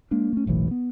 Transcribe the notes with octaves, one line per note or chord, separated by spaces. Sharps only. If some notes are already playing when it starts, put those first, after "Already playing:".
G#3 A#3 D4
A3 C#4
F#1 B1 A2 E3
B3